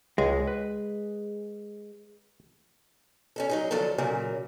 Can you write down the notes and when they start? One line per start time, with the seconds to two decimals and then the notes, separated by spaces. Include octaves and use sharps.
0.18 C#2 G#3
0.48 B4
3.36 C#4 D4 A4
3.49 F#3 D#4 G#4
3.71 D2 F3 F#3 D4 A4 A5
3.98 A#2 C#3 F#3 A#3